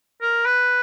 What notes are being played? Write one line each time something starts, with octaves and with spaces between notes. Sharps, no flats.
A#4
B4